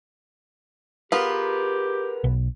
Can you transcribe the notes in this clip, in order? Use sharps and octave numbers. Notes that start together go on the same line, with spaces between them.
B3 F4 G4 G#4 A#4 B4
B1